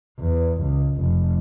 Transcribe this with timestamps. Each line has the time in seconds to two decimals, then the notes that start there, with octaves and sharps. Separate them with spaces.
0.20 E2
0.62 C#2
0.96 F1